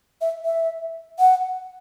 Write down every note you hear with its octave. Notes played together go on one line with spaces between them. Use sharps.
E5
E5
F#5